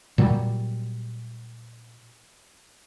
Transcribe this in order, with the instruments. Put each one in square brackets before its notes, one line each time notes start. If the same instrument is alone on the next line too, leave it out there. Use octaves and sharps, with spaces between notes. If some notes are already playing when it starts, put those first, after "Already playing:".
[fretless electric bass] A#2 F#3 G3